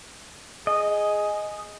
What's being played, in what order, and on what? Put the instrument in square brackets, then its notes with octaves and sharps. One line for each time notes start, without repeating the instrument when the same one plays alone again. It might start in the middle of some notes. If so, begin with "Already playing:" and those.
[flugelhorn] G#4 [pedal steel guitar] D#5